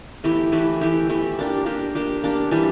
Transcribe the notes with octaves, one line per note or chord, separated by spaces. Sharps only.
E3 A3 E4 G4
E3 A3 E4 G4
E3 A3 E4 G4
E3 A3 E4 G4
A#3 D4 G4
A#3 D4 G4
A#3 D4 G4
A#3 D4 G4
E3 G3 D4 G4